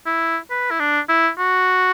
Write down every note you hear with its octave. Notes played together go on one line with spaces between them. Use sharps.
E4
B4
E4
D4
E4
F#4